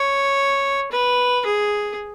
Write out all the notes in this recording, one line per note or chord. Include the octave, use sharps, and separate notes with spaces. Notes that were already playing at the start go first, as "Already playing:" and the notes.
Already playing: C#5
B4
G#4